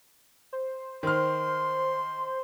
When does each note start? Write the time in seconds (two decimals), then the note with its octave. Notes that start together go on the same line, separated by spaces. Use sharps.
0.53 C5
1.03 D#3 C5 C6 F6